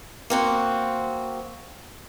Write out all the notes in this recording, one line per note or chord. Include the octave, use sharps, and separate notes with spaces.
A#3 C4 F#4